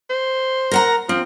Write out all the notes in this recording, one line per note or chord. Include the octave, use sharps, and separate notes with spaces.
C5
A#4 F#5 A#5
F3 C4